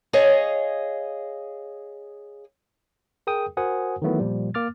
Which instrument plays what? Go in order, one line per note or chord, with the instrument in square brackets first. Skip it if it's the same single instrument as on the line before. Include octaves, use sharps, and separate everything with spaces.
[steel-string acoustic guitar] G#4 C#5 D#5 F5
[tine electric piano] G#4 A#4 G5 D#6
F#4 A#4 C5 F#5 G#5 D#6
D#3 E3 F#3 A3 B3 E4
A#2 F3 G3
A#3 D6 F6 A6